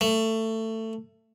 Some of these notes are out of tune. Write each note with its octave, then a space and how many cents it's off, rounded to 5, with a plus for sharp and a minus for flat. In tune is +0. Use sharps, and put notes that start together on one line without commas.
A3 +20